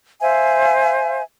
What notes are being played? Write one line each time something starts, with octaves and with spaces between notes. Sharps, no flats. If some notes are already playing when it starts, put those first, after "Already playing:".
C5 E5 F5 G#5